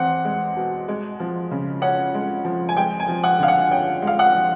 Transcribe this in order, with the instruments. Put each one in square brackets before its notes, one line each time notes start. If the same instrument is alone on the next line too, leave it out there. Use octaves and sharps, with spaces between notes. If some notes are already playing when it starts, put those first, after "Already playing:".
Already playing: [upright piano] E2 C4 F#5
G#3
B2
G#3
F3
C#3
C#4 F#5
G#3
F3
G#5
G#3 G5
G#5
F3
F#5
D3 F5
F#5
C#4 G5
G#3
F5
F#5
F3